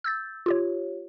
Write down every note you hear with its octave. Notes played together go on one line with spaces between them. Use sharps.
E6 G6 A6
F4 G4 C#5